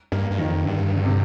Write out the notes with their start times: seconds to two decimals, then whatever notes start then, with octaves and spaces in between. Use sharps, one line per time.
0.12 G2 A#3
0.31 G2
0.38 F2 D#3
0.65 G2 D3
0.96 D3
1.05 C3